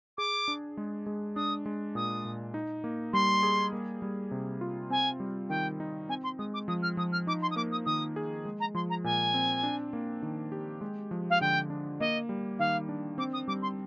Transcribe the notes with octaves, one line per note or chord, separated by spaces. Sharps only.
G#4 D6
D4
G#3
G#3
D4 D#6
G#3
A#2 D#6
A#2
D#4
A#3
G3 C6
G#4
A#3
G3
C3
F4
C4 G#5
G3
D#3 G5
D#4
C4 G#5
C6
G#3 D#6
D6
F3 D#6
F6
F3 D#6
F6
D#4 D6
C6
D#6
A#3 D6
D#6
D#3 D#6
G#4
G#3
A#5
F3 C6
A#5
A#2 G#5
C4
D4
A#3
D#3
G4
G#3
F3
F5
D3 G5
D4
A#3 D#5
G3
D#3 F5
D4
C4 D6
D#6
G3 D6
C6